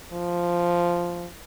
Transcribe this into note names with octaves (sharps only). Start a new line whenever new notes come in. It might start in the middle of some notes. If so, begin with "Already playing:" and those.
F3